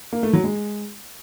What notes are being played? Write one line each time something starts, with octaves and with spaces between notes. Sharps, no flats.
A#3
A3
F#3
G#3